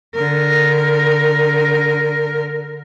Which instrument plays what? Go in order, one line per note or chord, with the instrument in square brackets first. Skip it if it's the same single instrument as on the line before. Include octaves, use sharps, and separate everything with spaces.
[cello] D3 A#4